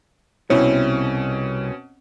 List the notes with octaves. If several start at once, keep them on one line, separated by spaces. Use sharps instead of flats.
C2 B2 C4 C#4 E4 C#5